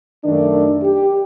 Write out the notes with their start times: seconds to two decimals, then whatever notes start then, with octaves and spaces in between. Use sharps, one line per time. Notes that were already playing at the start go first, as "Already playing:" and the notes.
0.25 F#2 D#3 A3 D4
0.82 G4